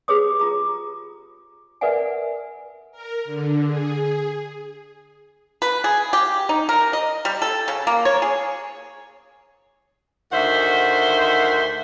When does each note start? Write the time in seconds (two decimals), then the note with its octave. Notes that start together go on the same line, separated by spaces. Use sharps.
0.08 G4 G#4 B4 C#5 D6 D#6
0.39 F4 A#5 D6
1.81 A#4 B4 D5 E5 F#5 G#5
2.92 A#4
3.25 D3
3.64 G#4
5.62 B4
5.84 G#4
6.13 G4
6.49 D#4
6.69 A#4
6.93 D#5
7.25 G3
7.42 A4
7.68 C#3
7.87 A#3
8.05 C#5
8.22 G#4
10.32 D2 D#3 C5 E5 F#5